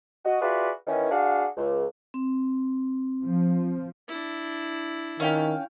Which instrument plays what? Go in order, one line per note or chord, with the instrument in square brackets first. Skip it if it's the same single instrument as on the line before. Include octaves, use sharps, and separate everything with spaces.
[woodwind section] F#4 D#5
F4 F#4 G#4 B4 D5 E5
D#3 E3 C#4
D4 F#4 G#4 F5 F#5
C#2
[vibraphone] C4
[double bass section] F3
[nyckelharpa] D4 E4
[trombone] D#3 [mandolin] C#4 F5 G5